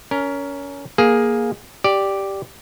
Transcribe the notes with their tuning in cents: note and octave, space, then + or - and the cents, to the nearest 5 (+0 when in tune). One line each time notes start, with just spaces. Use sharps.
C#4 +20 A#4 +0
A#3 +10 G#4 +0
G4 +0 D5 +0